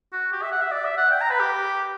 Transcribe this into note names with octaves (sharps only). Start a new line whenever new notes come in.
F#4
G4
E5
F#5
E5
D5
E5
F#5
G5
A#5
B4
G4